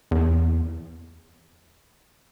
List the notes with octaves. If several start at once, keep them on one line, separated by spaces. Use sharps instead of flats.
E2